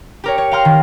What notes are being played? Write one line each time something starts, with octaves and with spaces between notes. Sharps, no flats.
G4 A#4 C#5
C#5
F5 G5 A#5 C6 F6
D#3